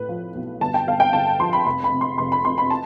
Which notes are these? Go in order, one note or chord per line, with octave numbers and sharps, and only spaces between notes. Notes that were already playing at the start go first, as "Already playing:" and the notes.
Already playing: A2 B4
F3
B1
G1 A5
G5
G1 F5
G5
G1 A5
F3 C6
B5
F1 B5
B5
C3
C6
F1 C6
B5
F2 C6
B5
A5